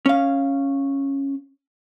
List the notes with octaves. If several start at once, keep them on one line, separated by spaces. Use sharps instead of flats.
C#4 F5